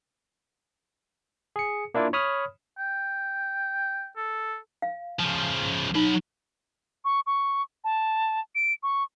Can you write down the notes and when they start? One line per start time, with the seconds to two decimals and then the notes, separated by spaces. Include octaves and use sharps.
1.56 G#4 C#7
1.94 A#3 D4 E4 F4
2.13 C#5 B5 D#6 F6
2.79 G5
4.16 A4
4.82 F5
5.20 C#3 F3
5.95 F#3 D#4 B5
7.05 C#6
7.26 C#6
7.84 A5
8.55 D7
8.83 C#6